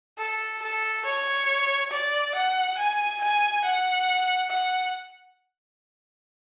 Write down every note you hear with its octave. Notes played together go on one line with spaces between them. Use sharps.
A4
A4
C#5
D5
F#5
G#5
G#5
F#5
F#5